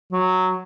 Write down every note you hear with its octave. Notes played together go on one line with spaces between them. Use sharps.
F#3